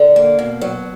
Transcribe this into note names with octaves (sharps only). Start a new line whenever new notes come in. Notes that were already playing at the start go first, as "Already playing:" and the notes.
Already playing: D3
A#3
B2
F#3